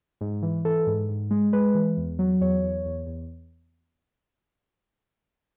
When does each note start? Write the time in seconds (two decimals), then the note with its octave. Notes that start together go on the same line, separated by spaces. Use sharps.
0.21 G#2
0.43 E3
0.65 E3 A4
0.87 G#2
1.09 G#2
1.31 G#3
1.53 G#3 B4
1.75 E3
1.97 E2
2.19 F#3
2.41 E2 C#5
2.62 E2
2.85 E2
3.07 E2